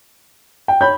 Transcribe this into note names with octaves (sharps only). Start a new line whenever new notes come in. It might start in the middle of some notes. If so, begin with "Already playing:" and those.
G5
C#5 B5 G6